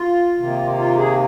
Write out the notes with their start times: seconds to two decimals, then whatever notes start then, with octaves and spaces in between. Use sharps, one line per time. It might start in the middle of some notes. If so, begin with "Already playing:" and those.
Already playing: F4
0.38 C3 D#3 A#3
0.77 F4
0.97 G#4